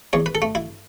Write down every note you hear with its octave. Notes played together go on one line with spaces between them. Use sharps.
E2 C#5
B4
A4
A3
E4